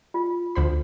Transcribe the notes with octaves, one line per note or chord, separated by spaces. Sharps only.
F4
D2 C5 B5